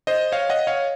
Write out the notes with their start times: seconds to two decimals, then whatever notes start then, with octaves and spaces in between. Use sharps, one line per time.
0.07 C5 D#5
0.32 C#5 F5
0.49 D#5 F#5
0.67 C#5 F5